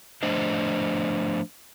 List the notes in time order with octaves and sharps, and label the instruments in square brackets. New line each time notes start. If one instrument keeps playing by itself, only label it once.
[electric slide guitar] F3 A3 D4 C5 D#5